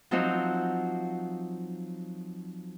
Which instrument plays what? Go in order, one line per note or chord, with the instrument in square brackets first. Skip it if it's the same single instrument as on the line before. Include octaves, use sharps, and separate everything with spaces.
[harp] F3 F#3 C4 D#4 F#4